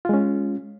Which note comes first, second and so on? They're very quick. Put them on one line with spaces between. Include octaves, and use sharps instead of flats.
F4 G#3 C#4